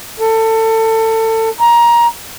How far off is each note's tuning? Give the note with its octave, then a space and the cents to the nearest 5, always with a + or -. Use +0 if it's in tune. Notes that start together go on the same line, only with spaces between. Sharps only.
A4 +25
A#5 +20